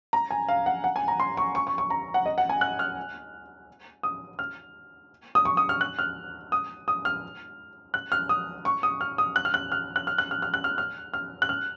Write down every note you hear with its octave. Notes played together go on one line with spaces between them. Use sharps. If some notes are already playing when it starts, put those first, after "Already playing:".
A#5
G#5
F5
F#5
F#5
G#5
A#5
C6
C#6
C#6
C#6
C#6
A#5
F#5
D#5
F#5
G#5
F#6
F6
D#6
F6
D#6
C#6
D#6
F6
F#6
F6
D#6
D#6
F6
F#6
F6
D#6
C#6
D#6
F6
D#6
F#6
F6
F#6
F6
F#6
F6
F#6
F6
F6
F#6
F6
F6
F6
F#6
F6